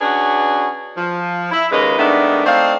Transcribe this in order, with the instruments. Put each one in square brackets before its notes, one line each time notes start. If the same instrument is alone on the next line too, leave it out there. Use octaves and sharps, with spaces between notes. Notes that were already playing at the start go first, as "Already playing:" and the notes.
[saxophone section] C#4 D4 F#4 G#4 B4 D5
F3
E4 E5
D#2 C#3 G#3 A#3 B4 D#5
G#2 D#3 A3 B3 D4
A3 C4 D4 D#4 F5